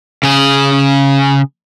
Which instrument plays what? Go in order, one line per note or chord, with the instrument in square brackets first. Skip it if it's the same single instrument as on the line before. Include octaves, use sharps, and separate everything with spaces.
[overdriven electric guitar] C#3 G#4